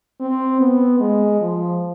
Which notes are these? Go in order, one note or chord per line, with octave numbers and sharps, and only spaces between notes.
C4
B3
G#3
F3